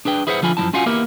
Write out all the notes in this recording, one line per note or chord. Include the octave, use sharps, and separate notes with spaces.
D4 G#4 B4 G5
E4 G#4 B4 C5 E5 F#5
D3 F3 F4 G#5 B5
F#2 F3 F#3 E4 A5
C#4 F4 F#4 F5 F#5 G#5
A#3 B3 E4 G4 A#4